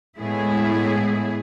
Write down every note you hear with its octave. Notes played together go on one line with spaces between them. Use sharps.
A2 G#3 B3 E4 G#4